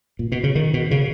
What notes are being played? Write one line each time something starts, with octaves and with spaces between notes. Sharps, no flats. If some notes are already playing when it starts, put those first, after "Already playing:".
A#2
B2
C#3
D#3
B2
C#3